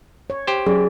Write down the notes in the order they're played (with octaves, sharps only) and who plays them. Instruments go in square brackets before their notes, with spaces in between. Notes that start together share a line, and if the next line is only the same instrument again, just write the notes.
[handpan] C#5
[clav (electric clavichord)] G4 C5
[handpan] F#3 C#4 D5 [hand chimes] G#4